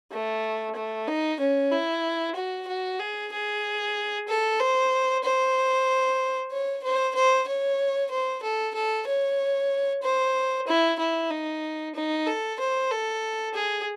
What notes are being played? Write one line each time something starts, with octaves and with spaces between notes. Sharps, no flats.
A3
A3
D#4
C#4
E4
F#4
F#4
G#4
G#4
A4
C5
C5
C#5
C5
C5
C#5
C5
A4
A4
C#5
C5
E4
E4
D#4
D#4
A4
C5
A4
G#4